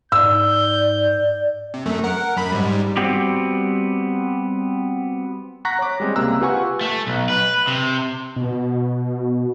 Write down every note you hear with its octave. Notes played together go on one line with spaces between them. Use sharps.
G#2 D5 E6 G6
C3
F#2 A3
A#4 F#5
F#2 B5
G#2 G3
G3 B3 C4 F#4 G4
F#5 A#5 C#6 F#6 A#6 B6
C#5 D6
G3 G#3 C4
C#2 C3 A#3 A#5 E6 F#6
F4 G4 B4 F#5 G#5 C#6
A3
B1
B4
C3
B2